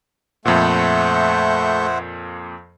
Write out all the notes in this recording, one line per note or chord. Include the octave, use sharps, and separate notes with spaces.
F2 A#2 A3 C5 E5 F#5 C#6 G6